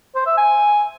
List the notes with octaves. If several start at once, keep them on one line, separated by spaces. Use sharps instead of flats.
C5
E5
G#5